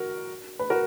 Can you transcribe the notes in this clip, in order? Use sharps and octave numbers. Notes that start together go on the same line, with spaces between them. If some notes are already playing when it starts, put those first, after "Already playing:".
Already playing: F#4 A#4
B4
F#4 A#4